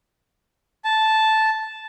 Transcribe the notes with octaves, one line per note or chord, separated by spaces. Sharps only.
A5